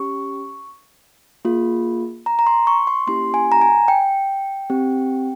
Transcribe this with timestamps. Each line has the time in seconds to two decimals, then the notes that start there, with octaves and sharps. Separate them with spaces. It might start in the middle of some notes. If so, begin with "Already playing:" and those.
Already playing: C#4 G4 C#6
1.45 A#3 F4 G#4
2.26 A#5
2.39 A#5
2.47 C6
2.67 C#6
2.87 C6
3.07 A#3 C#4 E4 G4 C6
3.34 G#5
3.52 A#5
3.61 G#5
3.88 G5
4.70 C4 G4